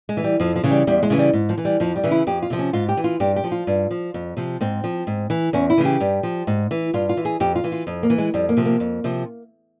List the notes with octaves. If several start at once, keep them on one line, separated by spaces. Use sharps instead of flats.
G#3
E3
G3
F2 F3
F3
C#3 E3
G3
E2 G3
G#3
C#3 E3
G3
G#2
F3
E3
G3
F2 F3
G3
C#3 E3
E4
F2 G4
F4
C3 F3
C#4
G#2 F4
G4
E3
F4
G2 G4
G4
F3
F4
G2
F3
F2
C3 F3
G#2 C4
F3
G#2
E3
E2 C#4
E4
C#3 E3
G4
G2
F3
G#2
E3
G2 F4
F4
E3
G#4
F2 G4
F4
E3
F4
F2
A#3
E3
G#3
F2 G3
A#3
C3 F3
A#3
F2
C3 F3